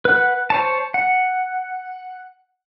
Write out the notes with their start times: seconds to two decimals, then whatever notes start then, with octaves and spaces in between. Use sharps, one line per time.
0.05 B4 F#5
0.50 C5 C#5 A5
0.94 F#5